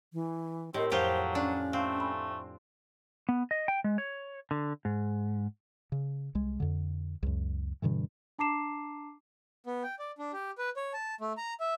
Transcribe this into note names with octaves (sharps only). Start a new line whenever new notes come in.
E3
A2 C4 G4 A#4 D#5
F2 F3 F#3 F4 G4 C5
C#4 D4 C#6
A3 C4 F5
G#5 B5
B3
D#5
G5
G#3
C#5
D3
G#2
C#3
C2 G#3
F2 D3
C#2 F#2
G2 B2 D3 E3
D4 A5 A#5 D6 C7 E7
B3
G5
D5
D4
G4
B4
C#5
A5
A3
A#5
E5